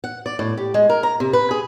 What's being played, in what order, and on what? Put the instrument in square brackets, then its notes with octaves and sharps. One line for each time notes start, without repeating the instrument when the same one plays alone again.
[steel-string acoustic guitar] F#5
D5
A2
G4
G#3
A#4
A#5
C3
B4
G#4